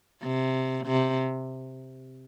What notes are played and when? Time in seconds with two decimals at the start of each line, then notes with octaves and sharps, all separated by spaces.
0.23 C3
0.87 C3